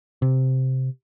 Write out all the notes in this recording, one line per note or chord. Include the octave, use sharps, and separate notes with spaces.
C3